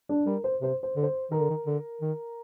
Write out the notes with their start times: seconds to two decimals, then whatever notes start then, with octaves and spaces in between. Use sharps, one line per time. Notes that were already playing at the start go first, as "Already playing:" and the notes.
0.09 D4
0.26 G3 A#4
0.44 C5
0.61 C3 C5
0.83 C5
0.96 D3
1.03 C5
1.31 D#3 A#4
1.41 D3
1.50 D#3
1.66 D3
2.01 D#3